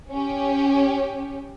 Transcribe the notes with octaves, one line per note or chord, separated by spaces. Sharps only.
C#4 G4